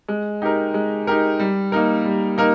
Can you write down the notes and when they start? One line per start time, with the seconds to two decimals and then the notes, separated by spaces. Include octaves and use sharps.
0.08 G#3
0.42 D#4 G4 A#4
0.74 G#3
1.07 D#4 G4 A#4
1.39 G3
1.72 A#3 D#4 A#4
2.05 G3
2.38 A#3 D#4 A#4